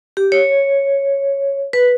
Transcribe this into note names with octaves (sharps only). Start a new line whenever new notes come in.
G4
C#5
B4